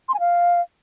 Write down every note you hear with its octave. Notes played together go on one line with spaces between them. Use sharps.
C6
G#5
F5